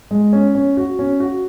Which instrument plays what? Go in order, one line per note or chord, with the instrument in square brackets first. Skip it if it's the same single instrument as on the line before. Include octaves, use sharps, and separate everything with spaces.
[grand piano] G#3
C#4
C#4
F#4
C#4
F#4